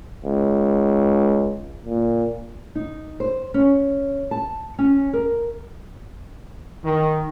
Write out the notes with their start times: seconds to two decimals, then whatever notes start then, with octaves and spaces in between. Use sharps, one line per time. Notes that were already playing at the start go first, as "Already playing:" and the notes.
0.25 C#2
1.85 A#2
2.75 D#4
3.20 C5
3.54 C#4
4.31 A5
4.79 C#4
5.13 A#4
6.84 D#3